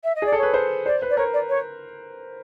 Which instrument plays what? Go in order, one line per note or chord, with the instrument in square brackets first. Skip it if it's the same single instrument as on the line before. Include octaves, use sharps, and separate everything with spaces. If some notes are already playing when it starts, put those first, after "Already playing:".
[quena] E5
D#5
[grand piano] G#4 [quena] D5
[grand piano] A4
[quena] C#5
[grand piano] B4
C5
[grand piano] C5 [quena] D5
[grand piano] B4
[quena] D5
[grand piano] A#4 [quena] C#5
[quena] D5
C#5